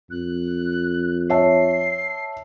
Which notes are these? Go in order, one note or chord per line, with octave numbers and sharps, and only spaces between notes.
F2 F#6
C#5 E5 A5 C7